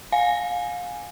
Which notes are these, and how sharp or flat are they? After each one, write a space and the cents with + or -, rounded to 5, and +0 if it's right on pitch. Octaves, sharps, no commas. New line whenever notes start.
F5 +30 G#5 +0